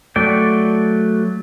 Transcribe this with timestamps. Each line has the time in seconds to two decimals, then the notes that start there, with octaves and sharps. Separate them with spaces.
0.16 F#3 A3 D5 G5